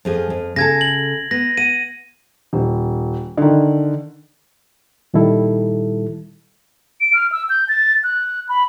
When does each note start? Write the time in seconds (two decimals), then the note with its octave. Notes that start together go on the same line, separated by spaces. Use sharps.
0.05 F2 F3 G#4
0.30 F2
0.56 C#3 A4 G#6 A#6
0.81 F#7
1.31 B3 A#6
1.57 F#5 D#7
2.53 D#1
3.38 D3 D#3
5.14 A#2 D#3 G3 E4 A4
7.01 D7
7.14 F6
7.32 E6
7.49 G6
7.69 A6
8.04 F#6
8.49 B5